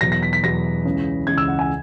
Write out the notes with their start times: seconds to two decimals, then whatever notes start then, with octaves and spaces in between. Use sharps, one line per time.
0.01 E2 B2 F#3 A#6
0.12 A#6
0.23 B6
0.33 B6
0.43 E2 B2 F#3 A#6
0.85 C#2 C#3 E3
1.27 C#2 C#3 E3 G#6
1.38 E6
1.48 F#5
1.59 G#5